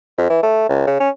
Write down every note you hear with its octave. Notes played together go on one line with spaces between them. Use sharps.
F2
E3
A3
C#2
C#3
C#4